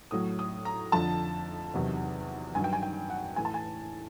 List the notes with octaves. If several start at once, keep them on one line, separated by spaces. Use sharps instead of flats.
A2 F#3 D#6
D#6
A#5
F2 D3 F3 A5
E2 C3 D#3 F#3
G2 D#3 F#3 G#5
G5
G#5
G5
F#5
A2 E3 G#5
A5
G#5